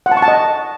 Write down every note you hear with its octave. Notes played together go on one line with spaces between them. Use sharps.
F#5
A5
C#6
A5
D#5